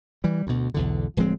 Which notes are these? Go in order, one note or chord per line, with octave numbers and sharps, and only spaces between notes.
E3 G3
D2 B2
B1 E2 D3
D1 F3 G#3 C4